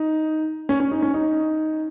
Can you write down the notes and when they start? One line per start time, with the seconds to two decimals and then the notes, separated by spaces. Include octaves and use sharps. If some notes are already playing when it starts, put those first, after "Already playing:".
Already playing: D#4
0.69 C#4
0.80 C#4
0.91 D#4
1.02 C#4
1.14 D#4